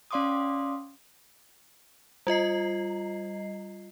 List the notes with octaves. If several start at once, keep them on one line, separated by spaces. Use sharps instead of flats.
C#4 D5 F5 C6 D6 D#6
G3 F4 D#5 C7